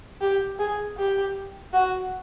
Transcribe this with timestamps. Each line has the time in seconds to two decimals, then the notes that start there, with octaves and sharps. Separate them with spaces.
0.21 G4
0.59 G#4
0.97 G4
1.73 F#4